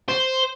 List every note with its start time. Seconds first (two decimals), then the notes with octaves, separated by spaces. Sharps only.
0.08 C5